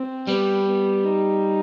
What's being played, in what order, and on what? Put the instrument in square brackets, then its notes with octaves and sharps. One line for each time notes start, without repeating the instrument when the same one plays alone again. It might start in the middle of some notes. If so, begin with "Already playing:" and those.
Already playing: [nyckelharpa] C4
[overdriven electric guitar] G3 [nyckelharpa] B3
[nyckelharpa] B3
D#4